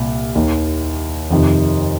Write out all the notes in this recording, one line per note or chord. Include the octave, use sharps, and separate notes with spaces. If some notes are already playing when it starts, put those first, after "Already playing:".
Already playing: C2 A#2
D#2 D#3
F2 C3 D#3